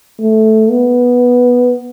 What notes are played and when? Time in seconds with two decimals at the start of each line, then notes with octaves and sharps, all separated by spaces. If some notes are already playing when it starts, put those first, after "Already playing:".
0.20 A3
0.71 B3